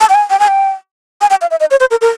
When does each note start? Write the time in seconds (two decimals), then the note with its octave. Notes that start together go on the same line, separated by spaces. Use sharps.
0.01 A5
0.09 G5
0.15 G#5
0.30 G5
0.39 G#5
0.48 G5
1.21 G#5
1.30 G5
1.41 F5
1.51 E5
1.60 D#5
1.71 C#5
1.80 C5
1.91 A#4
2.01 A#4